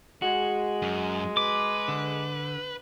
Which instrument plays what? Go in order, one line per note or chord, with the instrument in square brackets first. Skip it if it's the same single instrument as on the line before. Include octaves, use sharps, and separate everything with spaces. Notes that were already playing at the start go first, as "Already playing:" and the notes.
[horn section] G#3 [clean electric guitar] F#4
[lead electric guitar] F#2
[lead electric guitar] B4 [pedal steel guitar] D6
[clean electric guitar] D3